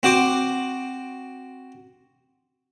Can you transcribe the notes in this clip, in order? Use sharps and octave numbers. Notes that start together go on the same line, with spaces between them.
C4 F#4 C5 D6